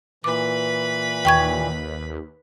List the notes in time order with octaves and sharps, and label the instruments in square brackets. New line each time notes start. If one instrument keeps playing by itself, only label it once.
[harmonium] A#2 E3 [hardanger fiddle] B4 B5 [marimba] D6
[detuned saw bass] D#2 [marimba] G5 C#6 G#6